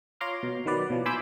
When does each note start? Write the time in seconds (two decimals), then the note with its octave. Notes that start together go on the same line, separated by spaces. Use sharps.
0.21 F4 C#5 A#5 C6 D6 F6
0.43 B2
0.66 D#3 F#3 B4 D5
0.90 B2 E3 F3
1.06 G#5 B5 C6 D6 E6 G6